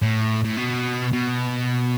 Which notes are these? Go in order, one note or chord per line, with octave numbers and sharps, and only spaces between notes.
A2
A2
B2
B2